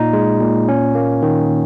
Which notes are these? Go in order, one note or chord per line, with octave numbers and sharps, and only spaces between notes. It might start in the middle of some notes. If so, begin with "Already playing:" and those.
Already playing: A#2 D#4
G#3
A#2
C#4
A#3
D#3